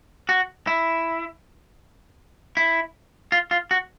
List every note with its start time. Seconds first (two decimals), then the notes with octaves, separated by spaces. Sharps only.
0.29 F#4
0.67 E4
2.57 E4
3.32 F4
3.51 F4
3.71 F#4